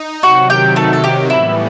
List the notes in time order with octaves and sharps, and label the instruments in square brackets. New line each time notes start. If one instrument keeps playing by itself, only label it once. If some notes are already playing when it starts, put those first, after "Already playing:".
Already playing: [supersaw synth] D#4
[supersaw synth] C3 D#3 F#3 [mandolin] F#4 F#5
[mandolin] G4 G5
A3 A4
A4
G4
[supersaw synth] A2 E3 G3 B3 [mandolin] E4